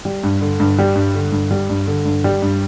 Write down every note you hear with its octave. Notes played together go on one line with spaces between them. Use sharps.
G3
G2
D3
G2
G3
G2
D3
G2
G3
G2
D3
G2
G3
G2